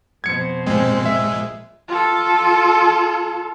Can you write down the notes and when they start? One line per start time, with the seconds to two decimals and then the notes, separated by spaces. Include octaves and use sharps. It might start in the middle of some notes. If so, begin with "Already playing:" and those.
0.24 F2 B2 C5 G#6 C#7
0.67 A#2 G#3 C4
1.06 E5
1.88 F4 A4